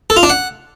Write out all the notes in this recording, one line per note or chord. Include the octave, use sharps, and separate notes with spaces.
A4
F4
D4
F#5